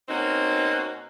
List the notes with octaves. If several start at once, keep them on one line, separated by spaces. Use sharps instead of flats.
B2 A#3 C4 C#4 D#4 F#4